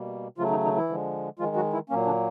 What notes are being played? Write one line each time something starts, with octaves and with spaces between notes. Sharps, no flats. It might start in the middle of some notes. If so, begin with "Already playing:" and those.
Already playing: B2 G3 A#3
C#3 F3 F#3 A3 F4
D#3 D#4
D#3 D#4
E3 E4
D3 F3 G#3
D#3 F3 G#3 F4
F#3 F#4
E3 E4
A#2 F#3 A#3 C#4
D3 D4